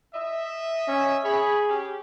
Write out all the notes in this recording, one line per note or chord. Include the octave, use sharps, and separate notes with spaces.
D#5 E5
C#4
G#4 C#5 B5
C#4 G4